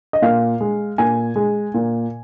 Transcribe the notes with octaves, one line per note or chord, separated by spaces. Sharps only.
D#5
A#2 F5
G#3
A#2 G#5
G#3
A#2